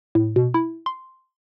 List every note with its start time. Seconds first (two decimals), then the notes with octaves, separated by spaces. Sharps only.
0.15 A2
0.36 B2
0.54 E4
0.86 C6